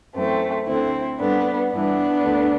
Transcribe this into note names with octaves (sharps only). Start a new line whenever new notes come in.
F#2 E3 A3 C4
D2 D3 C4 E4
G2 D3 B3 D4
G2 E3 B3 D4
D2 D3